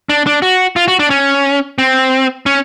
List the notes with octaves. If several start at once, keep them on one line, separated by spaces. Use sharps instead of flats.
D4
D4
F#4
F4
F#4
D4
C#4
C4
C#4